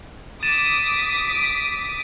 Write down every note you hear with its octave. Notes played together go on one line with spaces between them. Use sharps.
D6 D#6 A6 B6 D#7 E7
D7 D#7